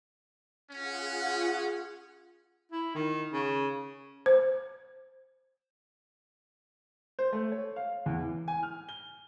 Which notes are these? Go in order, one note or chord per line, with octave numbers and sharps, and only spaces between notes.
C#4 F4 G#4 F#5
E4
D#3
C#3
C5
C5
A3
C#5
F5
E2
E3
G#5
F6
G7